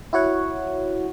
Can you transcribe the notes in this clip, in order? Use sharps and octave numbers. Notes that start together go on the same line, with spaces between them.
E4 F#4 C#5 F#5